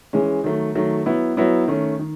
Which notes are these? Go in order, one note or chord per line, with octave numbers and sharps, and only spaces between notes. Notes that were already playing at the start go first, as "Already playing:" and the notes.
E3 G#3 C#4
D#3 F#3 A3
D#3 F#3 A3
F#3 B3 E4
F#3 B3 E4
D#3 A3 C#4
D#3